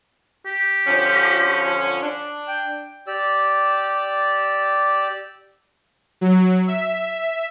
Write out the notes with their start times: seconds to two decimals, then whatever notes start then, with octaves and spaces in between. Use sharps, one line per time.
0.46 G4
0.87 D3 F3 C#4
2.02 D4
2.48 G5
3.07 G4 D5 E6
6.21 F#3
6.68 E5